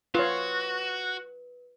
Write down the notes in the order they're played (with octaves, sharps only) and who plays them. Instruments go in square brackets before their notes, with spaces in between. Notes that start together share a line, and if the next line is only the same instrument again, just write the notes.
[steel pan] F4 C#5 [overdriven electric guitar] F#4 [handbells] B4